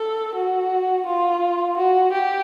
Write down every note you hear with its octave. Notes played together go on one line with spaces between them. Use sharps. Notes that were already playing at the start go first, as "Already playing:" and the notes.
Already playing: A4
F#4
F4
F#4
G4